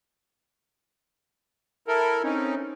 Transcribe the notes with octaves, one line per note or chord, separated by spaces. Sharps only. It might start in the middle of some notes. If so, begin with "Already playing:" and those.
E4 A4 A#4
C4 C#4 D#4